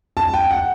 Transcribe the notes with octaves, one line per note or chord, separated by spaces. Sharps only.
A5
G5
F#5